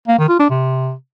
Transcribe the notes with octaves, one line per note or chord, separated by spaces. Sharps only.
A#3
D#3
F4
D4
C3